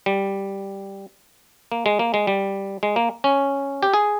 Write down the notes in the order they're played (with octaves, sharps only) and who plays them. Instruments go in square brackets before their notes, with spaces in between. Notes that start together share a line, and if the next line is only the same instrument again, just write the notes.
[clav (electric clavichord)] G3
A#3
G#3
A#3
G#3
G3
G#3
A#3
C#4
G4
G#4